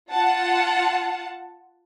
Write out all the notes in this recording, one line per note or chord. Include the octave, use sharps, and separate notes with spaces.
F4 F#5 A5